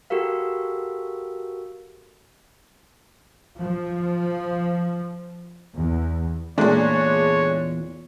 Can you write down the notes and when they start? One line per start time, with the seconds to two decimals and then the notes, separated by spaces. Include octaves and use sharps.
0.10 F#4 G4 A4 A#4 F5
3.60 F3
5.77 E2
6.58 E2 A#2 G#3 A3 D4 C#5